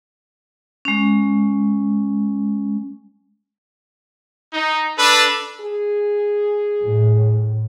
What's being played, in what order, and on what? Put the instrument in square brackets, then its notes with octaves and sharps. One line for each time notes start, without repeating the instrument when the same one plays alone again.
[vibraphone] G#3 C#4
[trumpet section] D#4
D4 A4 B4
[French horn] G#4
[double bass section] A2